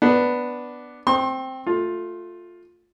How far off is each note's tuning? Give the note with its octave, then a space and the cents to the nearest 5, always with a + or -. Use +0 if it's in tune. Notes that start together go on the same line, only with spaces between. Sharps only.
B3 +0 D4 +0
C4 +0 C6 +40
A3 +0 F4 +15